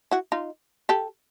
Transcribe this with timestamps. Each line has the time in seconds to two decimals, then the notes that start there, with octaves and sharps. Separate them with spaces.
0.11 E4 F#4
0.32 D#4 F4
0.89 G4 A4